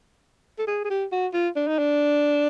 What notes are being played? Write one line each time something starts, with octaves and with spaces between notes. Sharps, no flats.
A4
G#4
G#4
G4
F#4
F4
D4
D#4
D4